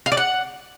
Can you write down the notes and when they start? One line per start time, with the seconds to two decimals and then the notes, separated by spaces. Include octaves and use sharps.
0.06 F5
0.12 D5
0.17 F#5